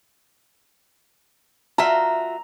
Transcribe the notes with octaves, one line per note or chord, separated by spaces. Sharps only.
F4 F#4 E5 A#5